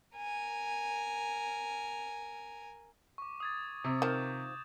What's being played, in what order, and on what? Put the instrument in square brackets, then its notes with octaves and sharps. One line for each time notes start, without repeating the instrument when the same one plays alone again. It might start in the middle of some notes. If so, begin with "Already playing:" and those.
[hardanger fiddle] A#4 G#5
[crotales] C#6 D6
D#6 G#6 A6
[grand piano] C3
[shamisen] D#3 F3 [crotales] G6 E7